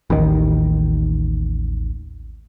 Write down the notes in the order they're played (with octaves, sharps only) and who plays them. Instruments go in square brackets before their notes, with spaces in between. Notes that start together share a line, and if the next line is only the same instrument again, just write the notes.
[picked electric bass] A1 D#2 D#3